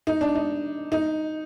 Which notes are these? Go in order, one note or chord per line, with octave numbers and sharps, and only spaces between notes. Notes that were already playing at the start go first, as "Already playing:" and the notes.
D#4
D4
D#4
D#4